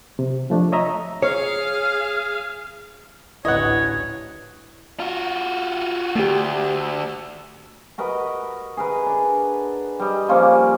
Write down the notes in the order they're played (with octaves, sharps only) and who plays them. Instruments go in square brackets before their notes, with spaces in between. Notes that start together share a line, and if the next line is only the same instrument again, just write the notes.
[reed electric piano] C3
F3 A3 D4
C#5 D#5 E5 A#5
[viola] G#4 F5 [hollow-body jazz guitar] C#5
[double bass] A1 D2 [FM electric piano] E4 B4 [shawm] C#5 [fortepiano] D#5 F#5
[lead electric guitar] F4 F#4
[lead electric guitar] D2 [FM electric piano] A3 G4
[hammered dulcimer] F#4 A#4 B4 D#5
G#4 A#4 B4
D4
G3 D#5
F3 G3 A#3 C#4